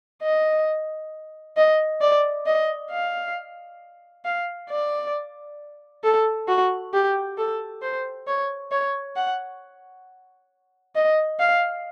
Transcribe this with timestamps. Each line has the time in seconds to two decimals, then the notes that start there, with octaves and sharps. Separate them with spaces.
0.23 D#5
1.57 D#5
2.01 D5
2.46 D#5
2.91 F5
4.25 F5
4.70 D5
6.04 A4
6.48 F#4
6.93 G4
7.38 A4
7.82 C5
8.28 C#5
8.72 C#5
9.16 F#5
10.96 D#5
11.40 F5